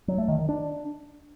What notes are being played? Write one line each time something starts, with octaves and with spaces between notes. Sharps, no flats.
F#3
A3
D#3
D#3
D4